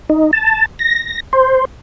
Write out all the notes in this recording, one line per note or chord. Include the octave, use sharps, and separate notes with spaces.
D#4
A5
A#6
C5